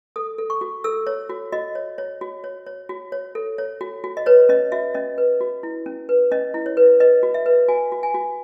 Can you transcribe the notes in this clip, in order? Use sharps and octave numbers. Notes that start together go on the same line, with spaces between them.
A4 D#6
A4
C#6
F#4
A4 E6
C#5
F#4
F#4 D#5
C#5
C#5
F#4
C#5
C#5
F#4
C#5
A4
C#5
F#4
F#4
D#5
B4 C#5
C#4 D#5
F#4 E5
C#4 D#5
B4
F#4
E4
C#4
B4
C#4 D#5
E4
C#5
B4
B4 D#5
F#4
E5
B4
F#4 G#5
F#4
G#5
F#4